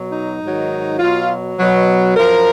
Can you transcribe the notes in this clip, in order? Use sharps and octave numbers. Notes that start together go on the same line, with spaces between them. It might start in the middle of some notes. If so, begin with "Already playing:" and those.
Already playing: B2 F#3
D#4
G#2 D#3 F#3
B2 F#3 F4
B2 F#3
F#2 F3 A#4